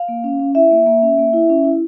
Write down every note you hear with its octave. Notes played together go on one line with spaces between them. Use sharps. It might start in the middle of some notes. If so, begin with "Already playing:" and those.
Already playing: F5
A#3
C#4
C#4
E4 E5
A#3
A#3
C#4
A#3
E4
C#4
E4